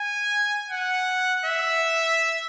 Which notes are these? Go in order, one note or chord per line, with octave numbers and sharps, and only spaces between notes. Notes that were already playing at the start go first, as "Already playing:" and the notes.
Already playing: G#5
F#5
E5